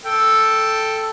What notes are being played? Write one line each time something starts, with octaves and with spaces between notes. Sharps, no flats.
A4 G5